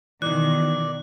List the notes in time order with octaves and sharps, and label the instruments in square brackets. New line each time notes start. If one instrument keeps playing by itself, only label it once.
[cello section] B2 D#3 [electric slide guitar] E3 [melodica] D5 [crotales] F#6